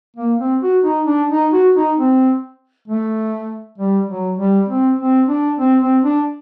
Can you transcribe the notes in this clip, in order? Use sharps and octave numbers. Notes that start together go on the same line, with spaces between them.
A#3
C4
F#4
D#4
D4
D#4
F#4
D#4
C4
A3
G3
F#3
G3
C4
C4
D4
C4
C4
D4